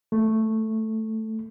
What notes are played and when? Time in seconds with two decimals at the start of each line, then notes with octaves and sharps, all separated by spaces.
0.12 A3